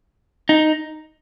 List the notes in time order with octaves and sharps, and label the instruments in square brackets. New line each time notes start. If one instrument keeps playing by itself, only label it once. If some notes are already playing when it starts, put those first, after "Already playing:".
[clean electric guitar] D#4